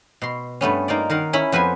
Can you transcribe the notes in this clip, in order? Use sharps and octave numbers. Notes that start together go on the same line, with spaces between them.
B2 C6
G2 A3 B3 C#4
A#3 D#4 F4 D5
D#3 A#4 F5 F#5
C#4 E4 B5
F2 B3 B4 C5 G#5